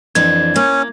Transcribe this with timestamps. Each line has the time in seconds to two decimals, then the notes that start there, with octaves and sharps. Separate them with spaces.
0.15 F2 E3 D4 G#6
0.56 A#3 C#4